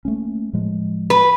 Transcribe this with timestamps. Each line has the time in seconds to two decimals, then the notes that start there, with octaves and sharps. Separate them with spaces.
0.05 A3 A#3 C#4
0.53 A2 F3 G#3
1.10 B4